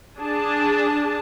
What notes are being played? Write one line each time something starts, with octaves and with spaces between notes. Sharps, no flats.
D4 G#4 A5